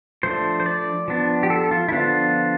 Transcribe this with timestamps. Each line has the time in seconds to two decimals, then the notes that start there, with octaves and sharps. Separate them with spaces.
0.23 F3 A3 D4 C5
0.60 C5
0.66 D5
1.08 F3 B3 D4
1.43 G4
1.50 A4
1.71 F4
1.89 E4
1.92 D3 F3 B3 D4 F4